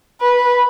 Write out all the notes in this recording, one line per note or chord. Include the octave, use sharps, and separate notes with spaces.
B4